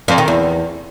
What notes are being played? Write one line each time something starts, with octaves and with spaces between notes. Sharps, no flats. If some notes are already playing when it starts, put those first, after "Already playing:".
F2
D#3
E2